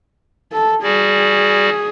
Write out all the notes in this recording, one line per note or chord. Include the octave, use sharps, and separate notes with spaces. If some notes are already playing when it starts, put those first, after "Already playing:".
A4
G3 F#4 G#4 D5